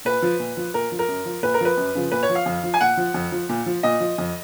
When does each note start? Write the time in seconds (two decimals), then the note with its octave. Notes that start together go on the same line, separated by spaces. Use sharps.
0.05 A#2 B4
0.22 F3
0.40 A#2
0.57 F3
0.74 A#2 A#4
0.92 F3
0.99 A#4
1.08 F#2
1.26 F3
1.43 A#2 B4
1.54 A#4
1.61 F3 B4
1.77 F#2
1.95 C#3 F3
2.12 A#2 B4
2.23 C#5
2.30 F3
2.35 F5
2.46 F2
2.63 F3
2.74 G#5
2.81 A#2 F#5
2.97 F3
3.14 F2
3.32 F3
3.49 A#2
3.66 F3
3.83 A#2 D#5
4.00 F3
4.18 F2